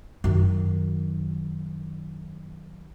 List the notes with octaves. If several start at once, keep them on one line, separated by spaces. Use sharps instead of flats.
F#2 D#3